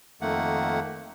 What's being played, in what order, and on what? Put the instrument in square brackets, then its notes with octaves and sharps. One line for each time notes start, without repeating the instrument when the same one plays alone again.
[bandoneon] F2 D#3 A3 A#3 F#5